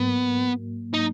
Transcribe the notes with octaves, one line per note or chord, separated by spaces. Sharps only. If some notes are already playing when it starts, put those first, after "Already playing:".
Already playing: G#2 F#3 A#3 B3
D#4